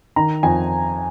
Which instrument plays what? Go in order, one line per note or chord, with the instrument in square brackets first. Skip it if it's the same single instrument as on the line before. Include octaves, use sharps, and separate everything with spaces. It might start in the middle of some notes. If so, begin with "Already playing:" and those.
[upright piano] D#3 [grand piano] A#5
[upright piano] F2 [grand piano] G#5